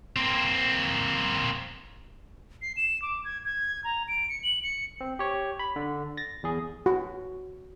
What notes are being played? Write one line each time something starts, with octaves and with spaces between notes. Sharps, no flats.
A#3 C4
C7
E7
D6
G#6
G#6
A#5
D7
C#7
F#7
C#7
C4
G4 C#5
B5
D3
A6 A#6
E2 G#4
F#4